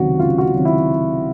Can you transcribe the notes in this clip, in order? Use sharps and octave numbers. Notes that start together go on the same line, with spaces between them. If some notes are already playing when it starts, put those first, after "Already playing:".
Already playing: C#2 C3 D#3 F#3 F#4
C#2 F4
F#4
F4
C3 D#3 F#3
E4